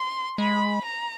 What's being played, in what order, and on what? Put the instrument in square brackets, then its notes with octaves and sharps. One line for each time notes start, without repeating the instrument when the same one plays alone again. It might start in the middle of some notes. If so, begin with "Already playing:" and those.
Already playing: [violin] C6
[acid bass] G#3 [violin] B5
[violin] A#5